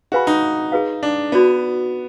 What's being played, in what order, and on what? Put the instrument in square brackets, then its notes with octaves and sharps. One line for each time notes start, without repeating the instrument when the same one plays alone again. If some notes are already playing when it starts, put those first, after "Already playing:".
[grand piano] F#4 [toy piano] G#4 B4 F5 G#5 B5
[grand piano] D#4
[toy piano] G#4 B4 F5
[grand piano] D4
[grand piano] B3 [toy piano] D#4 F#4 D5